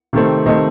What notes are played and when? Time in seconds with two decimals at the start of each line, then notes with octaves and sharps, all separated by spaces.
0.13 C3 D#3 A3 C4
0.46 C3 D#3 A3 C4 D#5